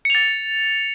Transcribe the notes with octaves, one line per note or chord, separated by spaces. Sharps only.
A6 C#7 F7